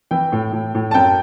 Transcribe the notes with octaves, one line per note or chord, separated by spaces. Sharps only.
E3 G5
A2
A2
A2
A5
F#2 G5